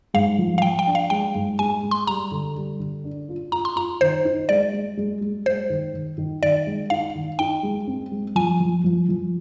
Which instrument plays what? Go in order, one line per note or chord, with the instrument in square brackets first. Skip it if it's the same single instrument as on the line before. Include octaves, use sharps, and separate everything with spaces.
[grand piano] G#2 [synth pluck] F5
[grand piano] F3
[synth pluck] F5
[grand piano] F3 [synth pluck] G5
[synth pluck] G5
[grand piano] D4
[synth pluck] F5
[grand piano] G#3 [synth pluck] G5
[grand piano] G#2
[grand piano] G#3 [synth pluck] G#5
[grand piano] G#3
[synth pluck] C6
[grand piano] G3 [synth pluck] A#5
[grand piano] D3
G3
D3
D4
F4
[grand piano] F4 [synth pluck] A#5
[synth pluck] C6
[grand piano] F4 [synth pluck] A#5
[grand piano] D#3 [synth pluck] C5
[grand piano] D#4
[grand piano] G#3 [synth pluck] D5
[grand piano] G#3
G#3
G#3
[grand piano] G#3 [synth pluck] C5
[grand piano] D#3
D#3
D#3
[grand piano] D#3 [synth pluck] D5
[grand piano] G#3
[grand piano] D#4 [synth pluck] F5
[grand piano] D#3
[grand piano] D#4 [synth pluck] G5
[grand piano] G#3
C4
G#3
[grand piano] F3 [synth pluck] G#5
[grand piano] F3
F3
F3